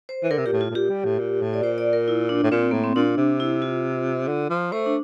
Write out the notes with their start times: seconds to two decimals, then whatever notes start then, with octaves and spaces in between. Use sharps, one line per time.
0.09 C5
0.24 E3
0.31 D3 A#4
0.38 C3
0.46 A#2 G4
0.53 A2
0.61 F4
0.71 A2
0.75 A#2 G4
0.89 G3
1.05 A2
1.19 A#2
1.42 A2
1.54 D5
1.63 A#2 C5
1.78 D5
1.93 A#4
2.08 E4
2.29 D4
2.44 A2
2.51 A#2 C4
2.71 A2 A#3
2.83 C4
2.95 A#2 D4
3.17 C3
3.40 E4
3.62 F4
4.28 D3
4.50 F3
4.72 A3 C5
4.86 D4